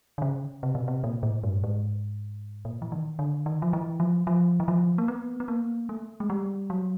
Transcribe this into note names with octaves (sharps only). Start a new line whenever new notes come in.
D3
C#3
C3
B2
C3
A#2
A2
G2
G#2
A#2
E3
D#3
D3
D#3
F3
E3
F3
F3
E3
F3
A#3
B3
B3
A#3
A3
G#3
G3
F#3